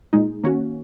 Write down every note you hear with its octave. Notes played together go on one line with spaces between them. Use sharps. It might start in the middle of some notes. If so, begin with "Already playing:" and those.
A#2 G#3 D#4
D#3 A#3 C#4 F#4